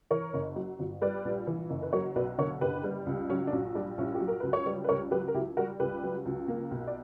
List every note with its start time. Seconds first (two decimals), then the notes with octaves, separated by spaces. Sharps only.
0.11 E3 A#4 C#5
0.34 F#1
0.56 F#3
0.79 G1
1.01 G3 B4 D5
1.25 A#1
1.47 E3
1.70 F#1
1.83 B4
1.93 F#3 A#4 C#5
2.16 B1 B4 D5
2.38 D3 A#4 C#5
2.61 F#1 G4 B4
2.84 G3
3.06 C#2
3.29 F#3 C#4
3.47 D4
3.52 A#1 C#4
3.75 G3 D4
3.98 A#1 C#4 E4
4.15 G4
4.20 F#3
4.28 A#4
4.40 C#2 B4
4.53 C#5
4.66 G3 B4 D5
4.84 B4
4.89 C#2 A#4 C#5
5.11 F#3 G4 B4
5.28 A#4
5.34 C#2 E4 G4
5.57 G3 F#4 A#4
5.80 C#2 G4 B4
6.03 F#3
6.25 C#2
6.48 A#3
6.71 B1
6.87 D5